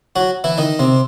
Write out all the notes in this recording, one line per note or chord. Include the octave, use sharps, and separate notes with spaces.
F#3 F#4
E3 E4
D#3 D#4
C3 C4